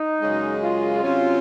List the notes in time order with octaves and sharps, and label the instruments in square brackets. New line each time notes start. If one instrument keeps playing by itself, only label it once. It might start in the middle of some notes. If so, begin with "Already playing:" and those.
Already playing: [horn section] D#4
[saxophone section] F#2 C#3 G#3
[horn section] F4
[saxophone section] C3 F#3 C#4